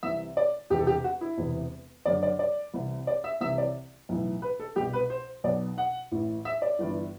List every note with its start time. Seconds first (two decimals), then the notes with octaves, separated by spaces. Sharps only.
0.03 C2 C3 E3 E5
0.37 D5
0.70 E1 E2 C3 G4
0.78 A4
0.87 G4
1.04 F#4
1.21 E4
1.37 E1 E2 C3 E3
2.06 F#1 F#2 D3 D5
2.23 D5
2.39 D5
2.74 C2 C3 E3
3.07 D5
3.24 E5
3.40 C2 C3 E3 E5
3.58 D5
4.09 B1 A2 E3
4.42 B4
4.60 A4
4.76 C2 B2 G4
4.93 B4
5.10 C5
5.44 B1 B2 D5
5.78 F#5
6.11 A1 A2 E3
6.45 E5
6.62 D5
6.79 G1 G2 E3